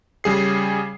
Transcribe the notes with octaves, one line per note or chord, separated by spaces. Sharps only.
C#3 G3 G#4 C7